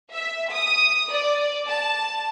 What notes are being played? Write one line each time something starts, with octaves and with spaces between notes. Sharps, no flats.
E5
D#6
D5
A5